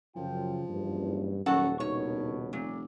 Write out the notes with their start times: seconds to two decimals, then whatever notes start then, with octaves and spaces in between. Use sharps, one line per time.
0.16 F#2 C#3 F3 F4 G5
0.68 F#1 E2 G2
1.46 D#1 F#2 F#4 A4 F#5
1.80 C#2 B2 D#3 D4 C#5
2.53 F1 A#2